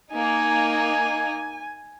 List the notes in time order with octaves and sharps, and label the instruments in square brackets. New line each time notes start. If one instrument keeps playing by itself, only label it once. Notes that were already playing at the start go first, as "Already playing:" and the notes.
[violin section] A#3 D#4 [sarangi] G#5